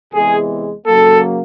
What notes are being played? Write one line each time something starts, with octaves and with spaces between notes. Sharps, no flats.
E2 C3 E3 G#3 G#4
C#3 F#3 A#3 A4